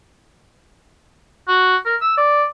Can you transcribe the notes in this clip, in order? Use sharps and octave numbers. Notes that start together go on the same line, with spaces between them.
F#4
A#4
E6
D5